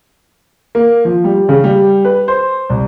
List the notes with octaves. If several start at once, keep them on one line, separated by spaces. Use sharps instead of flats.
A#3
F3
G3
C#3
G3
B4
C5
C2